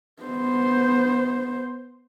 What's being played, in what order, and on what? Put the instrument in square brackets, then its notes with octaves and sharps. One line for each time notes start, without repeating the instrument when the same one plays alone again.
[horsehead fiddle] B3 C5